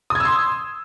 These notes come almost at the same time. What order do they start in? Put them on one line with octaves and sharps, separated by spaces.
D#6 G#6 E6 C6